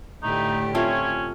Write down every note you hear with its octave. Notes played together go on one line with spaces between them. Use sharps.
A2 D3 A3 D#4 G4
A3 C4 C#4 F4 C#5